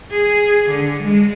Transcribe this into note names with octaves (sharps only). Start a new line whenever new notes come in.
G#4
D3
G#3